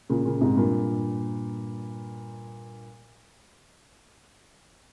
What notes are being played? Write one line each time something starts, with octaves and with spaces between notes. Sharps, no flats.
A#2 C#3
A#2 C#3
G#2 C3
G2 A#2